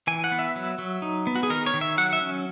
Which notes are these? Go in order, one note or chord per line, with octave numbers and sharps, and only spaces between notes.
E3 G#5
F#5
B3
E5
F#3
F#3
D#4
B3
F#4
G#4
D#3 A#4
C#5
D#3
E5
F#3 F#5
E5
C#4